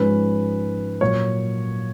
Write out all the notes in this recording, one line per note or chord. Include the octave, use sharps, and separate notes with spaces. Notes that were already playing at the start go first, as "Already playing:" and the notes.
Already playing: G#2 F3 G#3 C#4 B4
A#2 F#3 A#3 C#5